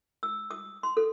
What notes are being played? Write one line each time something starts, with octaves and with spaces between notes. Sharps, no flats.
E6
D#6
C6
A4